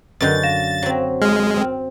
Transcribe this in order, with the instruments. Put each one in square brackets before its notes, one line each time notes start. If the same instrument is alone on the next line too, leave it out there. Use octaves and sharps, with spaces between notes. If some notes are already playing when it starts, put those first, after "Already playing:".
[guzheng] F#2 D3 C6 [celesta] B4 D#5 G6 [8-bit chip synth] A6
[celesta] F5 A#6 E7
[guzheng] F#3 C4
[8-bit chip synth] G#3 [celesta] F6
[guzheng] C4